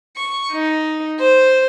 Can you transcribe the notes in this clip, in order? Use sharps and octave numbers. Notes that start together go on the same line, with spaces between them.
C#6
D#4
C5